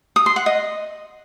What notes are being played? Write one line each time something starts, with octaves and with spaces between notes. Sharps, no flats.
D#6
C6
F#5
D#5